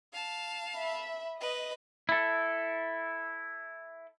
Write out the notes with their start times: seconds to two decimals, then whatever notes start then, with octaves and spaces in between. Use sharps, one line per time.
0.13 F5 A5
0.76 E5 B5
1.41 B4 D#5
2.09 E4 A4